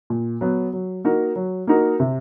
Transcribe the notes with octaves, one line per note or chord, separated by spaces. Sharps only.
A#2
F#3 B3
F#3
A#3 D#4 F#4 A#4
F#3
A#3 D#4 F#4 A#4
C3